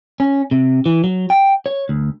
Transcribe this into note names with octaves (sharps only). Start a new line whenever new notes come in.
C#4
C3
E3
F#3
G5
C#5
D2